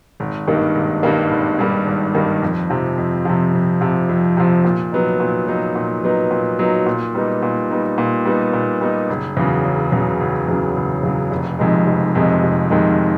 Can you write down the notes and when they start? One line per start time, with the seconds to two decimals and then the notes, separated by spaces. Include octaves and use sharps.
0.20 G#1
0.47 G2 D#3 G3 A#3
0.75 G#1
1.03 G2 D#3 G3 A#3
1.31 G#1
1.59 G2 D#3 G3 A#3
1.86 G#1
2.15 G2 D#3 G3 A#3
2.42 F2
2.70 C3 F3
2.98 F2
3.25 C3 F3
3.53 F2
3.81 C3 F3
4.09 F2
4.37 C3 F3
4.65 A#2
4.92 F#3 B3 D#4
5.20 A#2
5.48 F#3 B3 D#4
5.76 A#2
6.04 F#3 B3 D#4
6.31 A#2
6.59 F#3 B3 D#4
6.86 A#2
7.15 G3 B3 D#4
7.43 A#2
7.70 G3 B3 D#4
7.98 A#2
8.25 G3 B3 D#4
8.53 A#2
8.81 G3 B3 D#4
9.10 F#1
9.37 E2 C#3 F#3
9.64 F#1
9.92 E2 C#3 F#3
10.20 F#1
10.48 E2 C#3 F#3
10.76 F#1
11.03 E2 C#3 F#3
11.31 F1
11.59 F2 C3 D#3 G#3
11.87 F1
12.15 F2 C3 D#3 G#3
12.43 F1
12.70 F2 C3 D#3 G#3